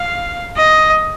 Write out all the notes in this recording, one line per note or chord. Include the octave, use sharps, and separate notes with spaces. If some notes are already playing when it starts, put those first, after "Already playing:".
Already playing: F5
D#5